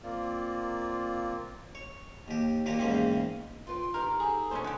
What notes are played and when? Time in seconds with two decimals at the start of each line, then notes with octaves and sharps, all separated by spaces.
0.03 A#3 C4 F4 D5
1.75 C#5
2.28 D#2 G4
2.66 D#2 A#2 A#3 G4 A#5
2.79 E2 G#2 C#3 A#3 C4 C#4
3.67 F4 B4 G5 C6
3.94 D#4 G4 A#4 B4
4.20 G#4 A4
4.51 B2 A3 C#4 D4 F4 C5
4.64 D3 F#3 G4